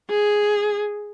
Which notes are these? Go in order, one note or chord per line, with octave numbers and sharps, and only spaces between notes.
G#4